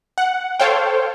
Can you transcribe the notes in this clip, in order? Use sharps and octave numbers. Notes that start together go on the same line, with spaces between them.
F#5
A4 C5 C#5 F5 G5